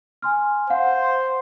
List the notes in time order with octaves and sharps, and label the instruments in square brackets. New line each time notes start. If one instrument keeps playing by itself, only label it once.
[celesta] G#5 C6 F6
[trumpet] C5 [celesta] F5 F#5 C6